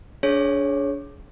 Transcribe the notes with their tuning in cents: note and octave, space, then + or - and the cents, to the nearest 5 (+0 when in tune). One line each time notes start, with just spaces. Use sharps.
D4 -30 G#4 +20 C#5 -10